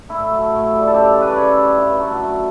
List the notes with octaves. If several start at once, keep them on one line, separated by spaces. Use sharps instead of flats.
A2 E4
F#3 A3
A2
G3
A4
C#3 G4
E3 A3
B4
D5
C#3 C#5
G3
G2
D3 F#3 A3
F#2